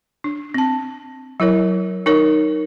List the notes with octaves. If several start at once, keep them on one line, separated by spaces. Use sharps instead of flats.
D4
C4 A5
F#3 E4 A#4 C#5
D#4 A#4 C#5